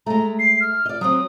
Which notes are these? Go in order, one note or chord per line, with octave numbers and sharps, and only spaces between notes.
G#3 A3 A#5
C7
F6
D5 D#5
F#3 C4 D#6